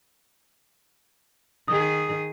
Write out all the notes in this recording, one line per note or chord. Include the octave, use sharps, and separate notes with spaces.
D#3 G#4 D#6